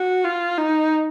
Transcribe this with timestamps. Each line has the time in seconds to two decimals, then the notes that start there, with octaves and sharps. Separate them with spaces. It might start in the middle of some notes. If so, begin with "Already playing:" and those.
Already playing: F#4
0.24 F4
0.58 D#4